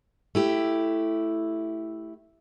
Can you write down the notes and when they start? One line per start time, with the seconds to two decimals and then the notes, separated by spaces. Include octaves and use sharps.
0.35 A3 E4 G4